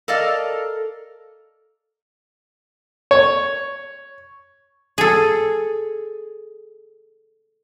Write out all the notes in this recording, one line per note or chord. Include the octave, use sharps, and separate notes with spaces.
A4 A#4 D5 D#5 F5
C#5
G#4 A4